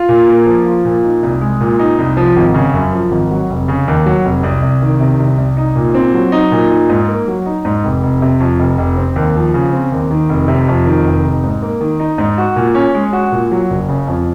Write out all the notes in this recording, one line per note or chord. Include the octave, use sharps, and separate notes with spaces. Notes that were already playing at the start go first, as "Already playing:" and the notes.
Already playing: F4
A#2
A#3
F3
F4
A#2
D#4
C2
G#3
A#2
D#4
C2
F3
G#1
C#3
F#2
F3
G#1
F#3
F1
C#3
D#2
F#3
F1
C2
C2
D#3
C3
C2
C2
D#4
A#2
C4
F#3
D#4
A#2
D#4
G#2
A#3
F#3
D#4
G#2
F1
F1
C3
F2
F1
F1
C4
D#2
F3
C#3
C4
D#2
D#3
F1
C3
F2
D#3
F1
D#4
G#2
A#3
D#3
D#4
G#2
F#4
A#2
C#4
G#3
F#4
A#2
F#3
F#1
C#3
F2